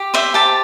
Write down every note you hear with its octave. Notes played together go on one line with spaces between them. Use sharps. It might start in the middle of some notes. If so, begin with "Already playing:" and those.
Already playing: G4
C5 E5
G4 A5